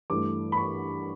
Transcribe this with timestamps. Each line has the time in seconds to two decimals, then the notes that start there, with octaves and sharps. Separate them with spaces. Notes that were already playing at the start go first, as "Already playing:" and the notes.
0.10 G2 E3 A3 D6
0.52 B5
0.57 C#6